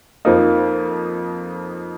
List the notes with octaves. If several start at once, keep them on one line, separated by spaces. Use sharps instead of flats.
F2 F3 A#3 D#4